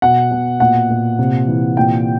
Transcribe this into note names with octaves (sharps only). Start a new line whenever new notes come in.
B2 F#5
B2
A#2 F#5
A#2
C3
E3
A#2 G5